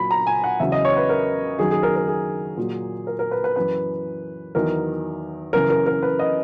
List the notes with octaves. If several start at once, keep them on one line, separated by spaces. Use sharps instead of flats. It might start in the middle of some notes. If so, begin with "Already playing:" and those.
Already playing: A#2 F#3 B5
A#5
G#5
F#5
E2 C#3 F#3 E5
D#5
C#5
B4
A#4
F#2 D#3 F#3 G#4
G#4
A#4
A#4
G#4
A#2 F#3
A#4
A#4
B4
B4
F#2 E3 B4
E2 D#3 F#3 A#4
F#2 C#3 E3 A#4
A#4
A#4
B4
D#5